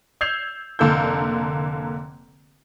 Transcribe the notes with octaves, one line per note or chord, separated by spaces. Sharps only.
E6 G6 G#6 C7 F7
F1 D3 A#3 A4 E6 G6